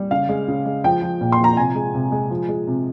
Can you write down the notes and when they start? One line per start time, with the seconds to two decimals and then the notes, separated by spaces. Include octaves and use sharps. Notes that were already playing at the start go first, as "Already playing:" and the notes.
Already playing: G3
0.11 C#3 F5
0.29 G#3
0.48 C#3
0.66 G#3
0.84 F3 G5
1.02 F3
1.21 A#2
1.32 C6
1.39 F3 A#5
1.57 C3 G#5
1.75 G#3
1.94 C3
2.12 G#3
2.30 F3
2.49 G#3
2.67 C3